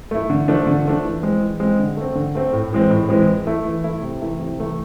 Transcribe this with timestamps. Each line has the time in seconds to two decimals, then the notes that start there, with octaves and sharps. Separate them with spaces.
0.11 A3 E4
0.30 D3
0.48 F3 A3 D4
0.67 D3
0.85 F3 A3 D4
1.04 E3
1.23 G#3 C4
1.41 E3
1.60 G#3 C4
1.79 D3
1.97 A3 C4
2.15 D3
2.35 A3 C4
2.53 A2
2.72 E3 G#3 C4
2.90 A2
3.09 E3 G#3 C4
3.28 E3
3.47 A3 E4
3.65 E3
3.84 A3 E4
4.02 C3
4.21 E3 A3 E4
4.40 C3
4.58 E3 A3 E4